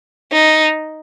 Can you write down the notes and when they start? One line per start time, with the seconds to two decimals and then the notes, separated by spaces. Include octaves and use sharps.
0.33 D#4